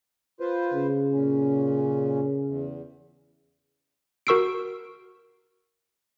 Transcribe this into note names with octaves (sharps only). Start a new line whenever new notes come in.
F4 B4 C5
C#3
A#2 C#4
E2
F#4 A#4 C#6 E6 C7 D7